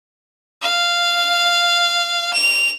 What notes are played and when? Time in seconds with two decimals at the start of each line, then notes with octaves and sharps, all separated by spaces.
0.62 F5
2.33 F7